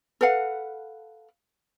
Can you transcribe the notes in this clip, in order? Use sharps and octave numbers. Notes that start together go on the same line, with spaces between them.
A4 B4 F5 F#5